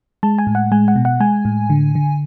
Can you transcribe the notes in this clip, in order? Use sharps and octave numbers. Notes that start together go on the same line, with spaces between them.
G#3 A5
G#5
A2
F#5
G#3 G#5
F#5
B2
F#5
G#3 G#5
A2
D3
D3